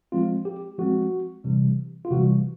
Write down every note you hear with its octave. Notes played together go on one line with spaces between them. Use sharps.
F3 G#3 C4 F4
G4
F3 G#3 C4 F#4
C3 E3 G3
F4
C3 E3 G3 F#4